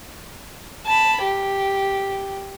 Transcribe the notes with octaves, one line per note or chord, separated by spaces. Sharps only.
A5 B5
G4